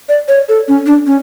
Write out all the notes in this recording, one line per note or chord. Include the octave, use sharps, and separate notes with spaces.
D5
C#5
A4
C#4
D4
C#4